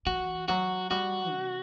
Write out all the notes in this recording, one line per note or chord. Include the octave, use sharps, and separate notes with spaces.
E3 F#4
F#3 F#4
G3 F#4
C3